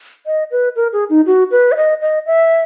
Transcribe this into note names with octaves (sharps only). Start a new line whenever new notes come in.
D#5
B4
A#4
G#4
D#4
F#4
B4
E5
D#5
D#5
E5